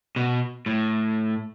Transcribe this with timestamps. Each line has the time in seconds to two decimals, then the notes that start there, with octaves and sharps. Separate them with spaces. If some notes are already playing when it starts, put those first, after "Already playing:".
0.16 B2
0.66 A2